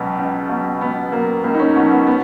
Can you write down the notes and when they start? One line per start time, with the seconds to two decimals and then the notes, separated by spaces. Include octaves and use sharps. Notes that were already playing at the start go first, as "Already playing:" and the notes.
Already playing: C#2 B2 F#3 B3
0.18 C#2
0.49 B2 F#3
0.81 C#2 B3
1.12 B2 F#3 A#3
1.44 C#2 A#3
1.54 D#4
1.59 C#4
1.76 B2 F#3 B3
1.91 B3
2.07 B3